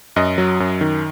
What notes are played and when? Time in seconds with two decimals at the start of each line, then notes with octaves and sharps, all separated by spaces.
0.16 F#2 D#5
0.38 F#3
0.60 F#2
0.81 D#3